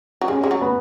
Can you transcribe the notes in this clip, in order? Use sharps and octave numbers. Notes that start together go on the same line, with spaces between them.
F#3
G#3 C#4
G#3
F#3
B3